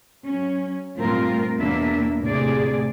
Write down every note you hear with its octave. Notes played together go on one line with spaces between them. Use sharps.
F#3 C#4
G2 A#2 A3 C4 F4 A#4
E2 B2 A#3 D4 A#4 E5
D2 A2 C3 G#4 D5